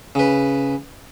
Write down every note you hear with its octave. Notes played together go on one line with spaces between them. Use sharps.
C#3 B4